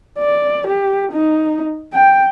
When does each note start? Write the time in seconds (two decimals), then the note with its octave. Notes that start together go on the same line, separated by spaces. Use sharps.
0.19 D5
0.68 G4
1.13 D#4
1.94 G5